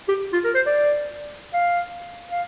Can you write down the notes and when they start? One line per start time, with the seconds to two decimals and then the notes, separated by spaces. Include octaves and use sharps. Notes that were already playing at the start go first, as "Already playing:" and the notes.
0.08 G4
0.33 F4
0.44 A#4
0.55 C5
0.66 D5
1.54 F5
2.31 F5